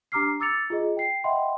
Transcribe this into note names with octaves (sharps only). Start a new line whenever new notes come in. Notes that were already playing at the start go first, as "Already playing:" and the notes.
D4 G4 A#5 D6 F6 C7
D6 E6 A6 C#7 F7
F4 G#4 D#5
G5 C7
D#5 E5 F#5 G5 B5 C6